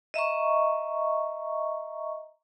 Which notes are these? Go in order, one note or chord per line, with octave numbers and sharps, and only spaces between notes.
D#5 E5 A#5 C#6